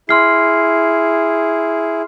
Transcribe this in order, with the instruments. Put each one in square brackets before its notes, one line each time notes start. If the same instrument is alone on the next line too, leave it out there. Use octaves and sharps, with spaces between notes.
[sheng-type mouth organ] E4 G#4 [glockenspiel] C6 F6 C7